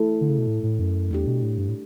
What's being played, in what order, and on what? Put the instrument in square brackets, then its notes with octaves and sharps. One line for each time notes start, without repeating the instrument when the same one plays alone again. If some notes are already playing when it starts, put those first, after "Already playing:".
Already playing: [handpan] A3 E4 A4
[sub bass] D3
C#3
B2
A2
A2
F#2
[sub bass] E2 [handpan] A3 D4 G4
[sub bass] B2
A2
G2
A2